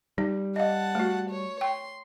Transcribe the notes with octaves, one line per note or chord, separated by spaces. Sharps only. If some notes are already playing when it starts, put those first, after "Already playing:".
G3 D#4
D#5 F5 F#5 A5
A3 F#4
C#5
G5 C6